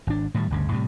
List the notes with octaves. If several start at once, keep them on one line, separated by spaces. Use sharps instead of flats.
G#1 D4
A2 D#3 G3
G1 D2 C#3
A2 C3 G3